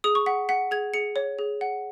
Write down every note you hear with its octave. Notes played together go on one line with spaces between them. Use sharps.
G#4 D#6
C#6
F#5 B6
F#5 B6
G#4 G#6
G#4 C#7
C#5
G#4
F#5